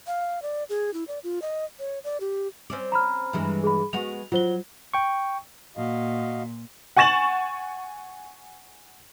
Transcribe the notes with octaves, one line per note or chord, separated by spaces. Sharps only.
F5
D5
G#4
E4
D5
F4
D#5
C#5
D5
G4
C4 C#4 D5
A#5 B5 F6
G2 E3 G#3
G#4 B5
G#3 B3 F#4 F7
F#3 F4 C5 G7
G5 C#6
A#2 F#4 D#5 F5
F#5 G#5 C#6 A6 E7 F#7